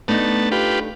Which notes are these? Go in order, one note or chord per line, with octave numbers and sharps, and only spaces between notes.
A3 B3 D4 D#4 A5
F4 G4 B4